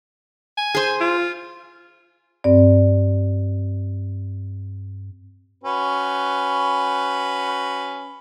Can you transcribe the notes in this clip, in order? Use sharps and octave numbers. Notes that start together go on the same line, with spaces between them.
G#5
G#4 C5
F4
G2 C4 D5
C#4 F#4 B4